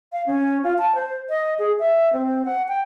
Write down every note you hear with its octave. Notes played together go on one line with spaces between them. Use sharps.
F5
C#4
F4
A5
C5
D#5
G#4
E5
C4
F#5
G5